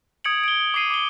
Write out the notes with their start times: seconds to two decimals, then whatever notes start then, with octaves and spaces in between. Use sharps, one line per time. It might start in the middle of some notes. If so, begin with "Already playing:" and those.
0.24 D#6 G#6 C#7 D7 F#7
0.44 D7 G7
0.60 D#6
0.74 D6 D#6 C7 D#7
0.90 D6 G7